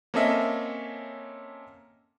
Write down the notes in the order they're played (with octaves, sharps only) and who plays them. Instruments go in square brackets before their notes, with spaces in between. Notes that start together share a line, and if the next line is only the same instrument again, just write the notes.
[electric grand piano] A#3 C4 C#4 A4 D#5 E5